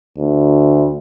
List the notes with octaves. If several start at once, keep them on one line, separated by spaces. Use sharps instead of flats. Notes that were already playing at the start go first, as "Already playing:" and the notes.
D2